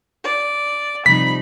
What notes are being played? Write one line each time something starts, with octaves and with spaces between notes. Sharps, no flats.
D5
C3 F3 G3 D#4 B5 B6